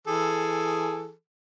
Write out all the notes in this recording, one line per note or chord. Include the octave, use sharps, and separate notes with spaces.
E3 G#4 A4